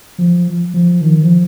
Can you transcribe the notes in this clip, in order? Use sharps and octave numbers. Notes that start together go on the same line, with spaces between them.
F3
F3
D#3
F3